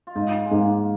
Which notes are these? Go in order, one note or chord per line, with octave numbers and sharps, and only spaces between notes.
F4
G#2 D#4
G#3
G#2 A#3